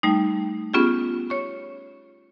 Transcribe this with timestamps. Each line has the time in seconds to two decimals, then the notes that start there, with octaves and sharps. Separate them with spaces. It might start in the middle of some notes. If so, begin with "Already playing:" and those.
0.03 G3 A3 D#4
0.74 B3 C#4 F4 G4 G#4
1.30 C#5 C#6